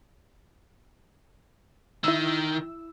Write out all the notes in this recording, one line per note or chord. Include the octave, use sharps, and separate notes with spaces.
D#3 E4 E6